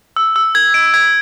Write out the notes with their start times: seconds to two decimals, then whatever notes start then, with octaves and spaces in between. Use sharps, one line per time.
0.16 E6
0.36 E6
0.55 G#6
0.74 D7
0.94 G#6